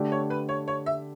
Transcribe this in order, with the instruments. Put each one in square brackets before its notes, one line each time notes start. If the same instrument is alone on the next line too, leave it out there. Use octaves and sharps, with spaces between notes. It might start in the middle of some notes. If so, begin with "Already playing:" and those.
Already playing: [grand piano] D3 A3 D4 G4
[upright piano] C#5
B4
C#5
C#5
E5